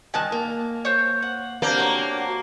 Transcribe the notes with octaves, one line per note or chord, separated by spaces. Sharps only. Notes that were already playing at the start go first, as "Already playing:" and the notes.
G2 D#3 G#5 A5 F#6
A#3
C5 C#5
F#5
A#3 C4 D4 G4 F#5
F#4 C#5